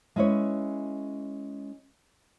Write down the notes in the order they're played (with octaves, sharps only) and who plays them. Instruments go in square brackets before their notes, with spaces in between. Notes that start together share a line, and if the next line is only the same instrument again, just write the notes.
[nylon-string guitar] G#3 C#4 E4 B4 C#5